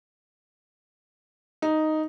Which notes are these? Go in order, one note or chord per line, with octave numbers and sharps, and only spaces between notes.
D#4